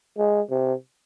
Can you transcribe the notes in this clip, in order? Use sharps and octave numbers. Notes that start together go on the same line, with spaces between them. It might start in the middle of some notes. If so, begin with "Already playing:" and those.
G#3
C3